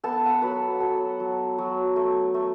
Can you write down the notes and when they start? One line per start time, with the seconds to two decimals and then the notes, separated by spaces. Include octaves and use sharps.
0.03 B3 A4 A5
0.26 F#5
0.34 A5
0.42 F#3 B4 B5
0.75 F#5
0.80 F#3 A4 A5
1.20 F#3
1.58 F#3
1.96 A3
2.34 A3